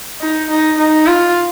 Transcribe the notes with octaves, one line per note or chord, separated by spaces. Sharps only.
D#4
D#4
D#4
F4